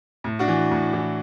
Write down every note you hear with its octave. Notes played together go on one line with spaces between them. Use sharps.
A2
D4 F#4
E3
A2
E3